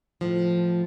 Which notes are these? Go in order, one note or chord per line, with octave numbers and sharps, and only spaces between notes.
A2 F3